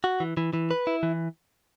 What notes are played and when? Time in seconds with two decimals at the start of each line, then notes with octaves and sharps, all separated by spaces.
0.04 F#4
0.20 E3
0.37 E3
0.54 E3
0.71 B4
0.87 E4
1.03 E3